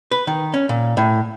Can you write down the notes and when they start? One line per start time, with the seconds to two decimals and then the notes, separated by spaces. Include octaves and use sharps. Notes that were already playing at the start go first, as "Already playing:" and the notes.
0.11 B4
0.27 D#3
0.54 C#4
0.69 A#2
0.97 A2